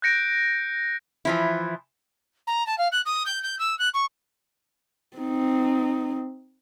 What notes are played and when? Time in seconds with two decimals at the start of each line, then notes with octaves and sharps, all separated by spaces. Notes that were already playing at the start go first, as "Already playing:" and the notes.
0.02 F#6 G6 A#6 C#7 D7
1.25 E3 F3 E4
2.47 A#5
2.67 A5
2.78 F5
2.92 F#6
3.06 D#6
3.26 G6
3.43 G6
3.59 E6
3.79 F#6
3.94 C#6
5.17 C4 D#4